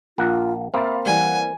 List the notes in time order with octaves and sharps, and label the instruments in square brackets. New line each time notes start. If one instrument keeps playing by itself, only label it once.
[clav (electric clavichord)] A#1 A#3 F#5 [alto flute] F4
[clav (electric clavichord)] A#3 C4 [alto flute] E5 [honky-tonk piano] F5 B5 A6
[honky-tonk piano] E3 G3 [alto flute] F#5 [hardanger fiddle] G#5